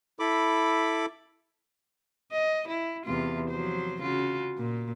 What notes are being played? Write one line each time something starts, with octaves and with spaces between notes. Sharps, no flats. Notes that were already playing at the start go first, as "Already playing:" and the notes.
E4 A4 B5 D6
D#5
E4
E2 C3 F4
F3 F#3 C5
C#3 F4 F#4
A#2